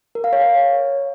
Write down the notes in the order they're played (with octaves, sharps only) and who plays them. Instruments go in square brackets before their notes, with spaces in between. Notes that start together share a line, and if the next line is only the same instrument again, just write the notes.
[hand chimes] A#4
F5
C#5